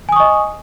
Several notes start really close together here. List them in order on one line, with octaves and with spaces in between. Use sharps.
G#5 D#6 C#6 D#5